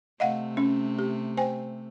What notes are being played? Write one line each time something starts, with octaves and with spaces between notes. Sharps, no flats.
C3 A3 D#5 F5 F#5
C#4
G4
C5 G5 G#5